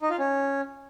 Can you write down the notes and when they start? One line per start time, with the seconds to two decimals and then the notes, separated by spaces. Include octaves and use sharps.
0.01 D#4
0.10 F4
0.19 C#4